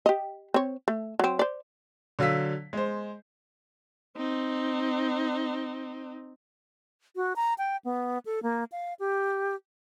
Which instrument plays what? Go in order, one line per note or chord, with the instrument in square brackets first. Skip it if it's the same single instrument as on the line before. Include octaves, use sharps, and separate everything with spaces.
[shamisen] G4 D#5
C4 C#5
A3
F#3 C4
C5 D5
[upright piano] D3 F#3 F5 E6 B6
G#3 C5
[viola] C4 D#4
[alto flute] F#4
A#5
G5
B3
A4
A#3
F5
G4